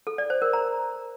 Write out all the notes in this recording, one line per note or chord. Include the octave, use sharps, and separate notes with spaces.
A4
D5
C5
A#4
A#5